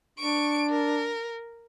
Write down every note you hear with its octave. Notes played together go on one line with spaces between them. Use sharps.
D4 C#6 D7
A#4